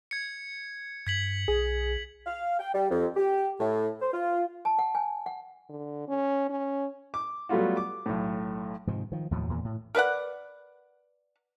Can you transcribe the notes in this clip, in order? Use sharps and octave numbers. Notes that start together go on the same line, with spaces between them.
G#6 C#7
G2 G#6 B6 F#7
B1 G#4
F5
G5
G3
F2
G4
A2
C5
F4
A5
F#5
G#5
F#5
D3
C#4
C#4
D6
F#3 G3 A3 B3 F4 F#4
D6
B1 A2
G#2 C3 D#3 F3
D#3 F3
D#2 A2 F3 F#3
E2 A#2 D#3
A2
A#4 B4 D5 F#5